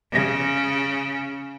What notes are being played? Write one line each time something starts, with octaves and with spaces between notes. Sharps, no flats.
C#3